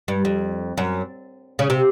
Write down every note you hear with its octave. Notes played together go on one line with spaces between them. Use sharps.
G2
F2
F#2
C#3
C3